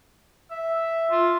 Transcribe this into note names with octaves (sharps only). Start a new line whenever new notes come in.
E5
F4